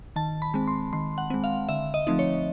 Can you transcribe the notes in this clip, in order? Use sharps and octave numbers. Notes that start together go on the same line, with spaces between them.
D#3 A5
B5
G#3 C4
C6
D#3 C6
F#5
G#3 C4
F5
D3 E5
D#5
F3 A3 C4 D#4
C#5